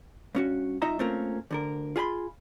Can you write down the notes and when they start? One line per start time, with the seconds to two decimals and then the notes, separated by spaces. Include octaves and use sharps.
0.35 G2 C#4 F#4
0.82 C2 D#4 F4 D#5 E5 A#5
0.99 A3 A#3 C4 C#4 F4 A#4
1.51 D2 D3 A#4
1.96 F4 G#4 G#5 B5 C6